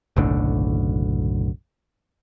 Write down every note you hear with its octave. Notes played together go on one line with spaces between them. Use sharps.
F#1 B1 A2 D3